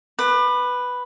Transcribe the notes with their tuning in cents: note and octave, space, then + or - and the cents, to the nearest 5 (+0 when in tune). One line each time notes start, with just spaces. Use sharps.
B4 +0 D6 +40